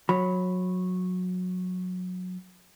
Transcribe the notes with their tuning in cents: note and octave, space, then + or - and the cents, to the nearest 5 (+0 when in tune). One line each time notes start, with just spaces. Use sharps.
F#3 -20 B5 +0